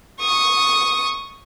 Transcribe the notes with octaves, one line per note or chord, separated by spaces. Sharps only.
C#6 D#6